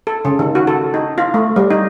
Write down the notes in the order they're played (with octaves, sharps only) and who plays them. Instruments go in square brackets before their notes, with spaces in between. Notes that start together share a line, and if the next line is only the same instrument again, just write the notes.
[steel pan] A4
C#3
D#3
F#4
A4
D#4
F4
A3
G3
D#4